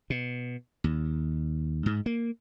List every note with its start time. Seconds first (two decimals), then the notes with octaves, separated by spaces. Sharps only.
0.10 B2
0.84 D#2
1.86 G#2
2.06 A#3